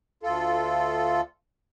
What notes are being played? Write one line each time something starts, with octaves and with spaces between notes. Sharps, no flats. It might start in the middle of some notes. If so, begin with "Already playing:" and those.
D2 F4 A4